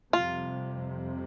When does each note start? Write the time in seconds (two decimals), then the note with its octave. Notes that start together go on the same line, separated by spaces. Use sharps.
0.13 F2 C3 G3 F4